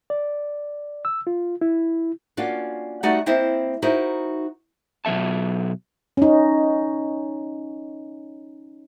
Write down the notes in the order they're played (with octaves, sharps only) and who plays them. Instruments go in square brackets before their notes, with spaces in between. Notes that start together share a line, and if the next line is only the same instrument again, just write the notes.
[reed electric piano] D5
E6
F4
E4
[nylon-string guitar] A#3 C#4 D4 F4 F#4
G3 A3 D#4 F#4 D5 F#5
A#3 C4 E4 C5 D#5
D#4 E4 F#4 A#4 C5 D#5
[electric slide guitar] B2 F#3 A#3 E5 A5
[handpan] C#4 D#4